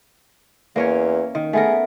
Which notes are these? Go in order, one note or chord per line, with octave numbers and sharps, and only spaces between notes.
E2 A#3 C#4 C#5
D#3
A3 B3 G#4 A#4